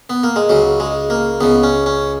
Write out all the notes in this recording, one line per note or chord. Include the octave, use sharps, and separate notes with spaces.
B3
A#3
G#3
C#2 C#3 F#3
G#3
A#3
C#2 C#3 B3
C#4
C#4